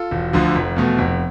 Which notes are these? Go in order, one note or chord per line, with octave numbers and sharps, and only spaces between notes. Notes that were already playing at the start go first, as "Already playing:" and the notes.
Already playing: F4 A4
E1
D2 D3 F3
F1
E2 B2 A3
F1